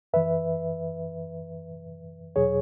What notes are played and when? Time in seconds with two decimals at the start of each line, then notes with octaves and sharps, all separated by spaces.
0.13 F#2 E3 B4 E5
2.36 E2 B2 F#3 G#4 C#5